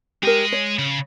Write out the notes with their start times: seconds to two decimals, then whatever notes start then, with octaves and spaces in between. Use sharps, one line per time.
0.23 G#3 G4 A#4 D#5
0.52 C#5
0.79 C#3